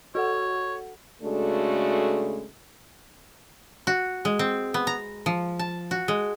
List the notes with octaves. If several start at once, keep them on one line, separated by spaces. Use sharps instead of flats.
F#4 A4 C#5 F#5
C#3 G#3 A3 D4 F#4 A4
F#4
G#3
C4
B3
A#5
F3
A5
F#4
G#3